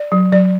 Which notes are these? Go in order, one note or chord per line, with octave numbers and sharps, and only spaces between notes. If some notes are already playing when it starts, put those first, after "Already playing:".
Already playing: D5
F#3
F#3 D5